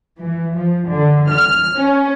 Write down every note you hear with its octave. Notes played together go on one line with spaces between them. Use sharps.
E3
F3
D3
F6
C#4